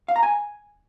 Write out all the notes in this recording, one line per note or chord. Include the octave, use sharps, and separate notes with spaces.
F5
A#5
G#5